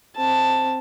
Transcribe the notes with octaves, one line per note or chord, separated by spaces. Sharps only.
C4 A5